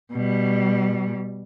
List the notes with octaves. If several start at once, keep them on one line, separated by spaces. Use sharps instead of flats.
B2 G3